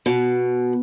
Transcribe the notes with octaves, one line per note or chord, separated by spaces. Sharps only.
B2